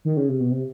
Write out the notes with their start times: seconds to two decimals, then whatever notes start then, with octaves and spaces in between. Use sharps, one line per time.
0.05 D#3
0.17 C#3
0.29 C3
0.40 B2
0.52 C3